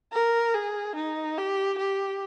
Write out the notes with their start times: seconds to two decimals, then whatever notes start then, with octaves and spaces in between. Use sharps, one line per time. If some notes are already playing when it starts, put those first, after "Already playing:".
0.13 A#4
0.54 G#4
0.96 D#4
1.38 G4
1.78 G4